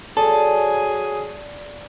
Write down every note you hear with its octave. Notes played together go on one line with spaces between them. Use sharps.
F#3 G#4 A4 D5 G#5